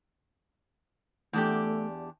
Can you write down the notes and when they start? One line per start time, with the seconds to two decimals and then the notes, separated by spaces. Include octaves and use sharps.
1.33 E2 A3 D4 G4